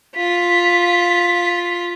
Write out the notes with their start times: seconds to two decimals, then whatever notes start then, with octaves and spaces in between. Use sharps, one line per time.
0.15 F4 B6